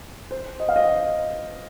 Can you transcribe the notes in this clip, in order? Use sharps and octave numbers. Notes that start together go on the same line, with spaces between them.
C5
D#5
F5
D#5